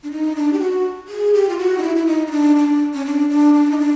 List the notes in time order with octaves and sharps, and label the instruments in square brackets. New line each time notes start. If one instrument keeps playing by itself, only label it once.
[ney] D4
D#4
D4
G4
F#4
G#4
G4
F4
F#4
D#4
E4
E4
D#4
D#4
D4
D4
C#4
D4
D4
D4
D#4
D4